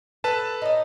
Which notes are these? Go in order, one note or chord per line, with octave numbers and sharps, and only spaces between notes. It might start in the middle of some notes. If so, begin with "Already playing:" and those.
A4 B4 A5
D#4 C#5 D#5